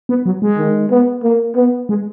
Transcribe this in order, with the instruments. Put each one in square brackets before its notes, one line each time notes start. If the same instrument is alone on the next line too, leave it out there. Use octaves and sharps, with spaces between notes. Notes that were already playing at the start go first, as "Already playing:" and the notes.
[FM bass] B3
F#3
G#3
[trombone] D#3
B3
A#3
B3
[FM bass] G#3